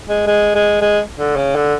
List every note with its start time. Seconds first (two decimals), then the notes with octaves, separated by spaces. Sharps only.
0.09 G#3
0.27 G#3
0.55 G#3
0.81 G#3
1.18 D3
1.36 C#3
1.55 D3